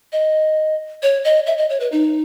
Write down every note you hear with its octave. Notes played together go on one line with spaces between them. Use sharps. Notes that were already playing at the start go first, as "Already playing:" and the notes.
D#5
C#5
D#5
E5
D#5
C#5
B4
D#4